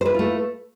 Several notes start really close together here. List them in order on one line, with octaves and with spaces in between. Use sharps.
C5 B4 E4 F4 A3